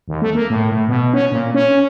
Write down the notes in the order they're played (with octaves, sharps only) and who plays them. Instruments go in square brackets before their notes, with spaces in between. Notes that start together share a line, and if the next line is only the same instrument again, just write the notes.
[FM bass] D#2
A3
A#3
A2
A2
B2
C#4
A#2
C#4